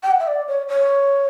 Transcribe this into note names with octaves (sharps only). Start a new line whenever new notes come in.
G5
F#5
E5
D5
C#5
C#5